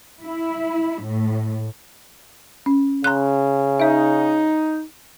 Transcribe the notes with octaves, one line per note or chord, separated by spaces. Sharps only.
E4
A2
C#4
C#3 A#5 C6 F#6
D#4 C#5 E5